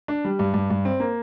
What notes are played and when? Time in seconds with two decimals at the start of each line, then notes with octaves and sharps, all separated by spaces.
0.08 D4
0.25 G3
0.39 G2
0.54 G2
0.70 G2
0.85 C4
1.00 A#3